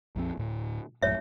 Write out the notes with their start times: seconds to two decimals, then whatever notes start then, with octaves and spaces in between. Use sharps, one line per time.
0.16 A#1 F2 C4
0.37 D1 A2
1.02 A#1 F#2 A2 C#5 E5